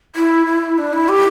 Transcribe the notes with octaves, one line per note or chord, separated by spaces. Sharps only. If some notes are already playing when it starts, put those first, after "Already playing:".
E4
E4
D4
E4
G4